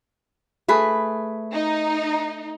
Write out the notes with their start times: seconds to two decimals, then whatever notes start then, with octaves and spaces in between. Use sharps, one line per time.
0.68 A3 G#4 B4
1.54 D#4